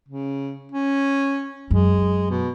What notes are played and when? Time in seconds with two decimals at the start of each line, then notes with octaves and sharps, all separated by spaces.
0.08 C#3
0.72 C#4
1.71 F#2 G#3
2.30 B2